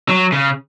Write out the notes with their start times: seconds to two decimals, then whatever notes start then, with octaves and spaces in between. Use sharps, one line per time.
0.09 F#3
0.32 C#3